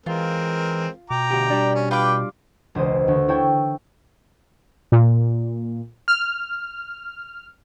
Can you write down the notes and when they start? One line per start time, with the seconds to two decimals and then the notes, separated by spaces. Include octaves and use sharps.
0.06 E3 G#3 C4 F4 A#4
1.10 B2 G5 A#5 D6
1.31 D2 G4
1.50 G3 D4
1.75 C#4
1.91 F4 B4 G5 D6
2.75 E1 C#2 C5 D#6
3.08 D2
3.28 E4 C#5 E5 G5 A5
4.92 A#2
6.08 F6